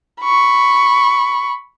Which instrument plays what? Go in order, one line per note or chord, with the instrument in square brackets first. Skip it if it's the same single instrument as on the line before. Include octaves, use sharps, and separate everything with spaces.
[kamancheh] B5 C#6